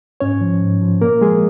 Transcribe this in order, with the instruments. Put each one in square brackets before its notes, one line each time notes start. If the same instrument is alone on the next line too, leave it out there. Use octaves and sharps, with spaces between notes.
[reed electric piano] G#2 C#4 C#5
F3
G#2
F3
A#2 A#3 A#4
F3 G#3 G#4